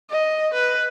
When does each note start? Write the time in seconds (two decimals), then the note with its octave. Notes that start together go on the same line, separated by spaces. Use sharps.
0.10 D#5
0.54 B4